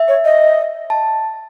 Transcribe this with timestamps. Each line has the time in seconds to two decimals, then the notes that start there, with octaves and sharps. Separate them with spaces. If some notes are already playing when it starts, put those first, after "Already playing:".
Already playing: E5
0.08 C#5
0.25 D#5
0.90 A5